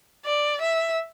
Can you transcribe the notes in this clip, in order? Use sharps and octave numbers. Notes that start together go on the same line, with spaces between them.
D5
E5